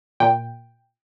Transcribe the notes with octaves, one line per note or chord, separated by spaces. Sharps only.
A#2 G5